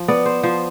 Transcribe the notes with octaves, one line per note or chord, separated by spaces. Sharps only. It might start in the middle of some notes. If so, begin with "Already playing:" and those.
Already playing: F3
B3 D5
C5
F3 C5